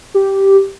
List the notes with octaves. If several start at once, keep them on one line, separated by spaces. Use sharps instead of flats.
G4